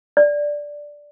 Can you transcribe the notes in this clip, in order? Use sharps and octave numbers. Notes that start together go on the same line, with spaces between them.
D5